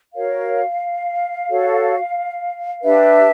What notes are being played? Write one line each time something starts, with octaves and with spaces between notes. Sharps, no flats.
F#4 A#4 C#5 F5
F#4 A4 C#5
D4 G4 B4 E5